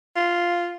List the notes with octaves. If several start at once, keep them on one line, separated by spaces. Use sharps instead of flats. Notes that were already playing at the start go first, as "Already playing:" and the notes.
F4